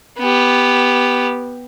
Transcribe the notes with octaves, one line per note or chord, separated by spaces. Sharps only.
B3 G4